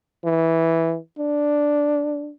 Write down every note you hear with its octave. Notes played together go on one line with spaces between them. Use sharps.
E3
D4